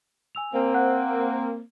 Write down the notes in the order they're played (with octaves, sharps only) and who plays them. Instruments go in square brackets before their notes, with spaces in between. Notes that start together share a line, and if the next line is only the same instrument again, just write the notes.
[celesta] G#5 E6 F7
[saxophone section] A#3 C4
[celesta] C5 F#5 F#6